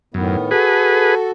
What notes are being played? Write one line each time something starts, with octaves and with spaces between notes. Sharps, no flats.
F#2 A2 D#3 B3
F#4 G#4 A4 B4